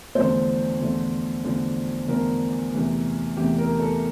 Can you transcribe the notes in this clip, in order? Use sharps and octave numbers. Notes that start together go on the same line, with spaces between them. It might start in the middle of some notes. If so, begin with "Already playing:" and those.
E2 D3 F3 A3 C5
E2 D3 F3 A3
E2 D3 F3 A3
E2 D3 F3 A3 A#4
E2 C3 E3 A3
E2 C3 E3 A3 G4
A#4
A4